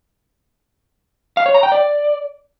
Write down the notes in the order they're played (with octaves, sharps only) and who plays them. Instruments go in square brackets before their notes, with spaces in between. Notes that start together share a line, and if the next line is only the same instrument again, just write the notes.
[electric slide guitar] F5
C#5
A#5
G5
D5